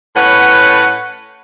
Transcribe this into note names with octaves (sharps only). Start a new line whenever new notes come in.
A2 C#4 B4 F#5